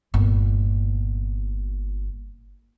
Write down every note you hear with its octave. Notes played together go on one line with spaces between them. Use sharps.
G1 A#2